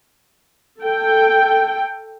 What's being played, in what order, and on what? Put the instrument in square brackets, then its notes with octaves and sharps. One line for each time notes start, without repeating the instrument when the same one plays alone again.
[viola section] A4 G5